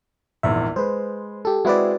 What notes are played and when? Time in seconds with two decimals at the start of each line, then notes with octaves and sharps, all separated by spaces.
0.43 A#1 E2 G#2 E5
0.76 G#3 B4 C5
1.45 G4 A4
1.65 G#3 C4 E4 F#4 B4 D5